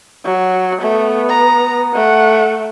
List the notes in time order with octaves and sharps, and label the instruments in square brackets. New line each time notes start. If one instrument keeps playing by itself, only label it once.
[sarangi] F#3
[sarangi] A3 [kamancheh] B3
[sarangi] A#5
[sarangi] A3 [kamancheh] F#5